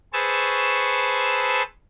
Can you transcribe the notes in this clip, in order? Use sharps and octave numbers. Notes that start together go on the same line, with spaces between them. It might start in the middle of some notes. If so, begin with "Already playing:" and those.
G#4 B4 C5 A5 C#6 E6